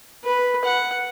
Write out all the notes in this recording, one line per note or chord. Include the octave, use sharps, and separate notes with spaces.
B4
F#5